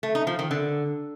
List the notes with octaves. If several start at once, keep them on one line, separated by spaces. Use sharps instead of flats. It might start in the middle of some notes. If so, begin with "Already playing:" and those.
A3
D#4
F3
D#3
D3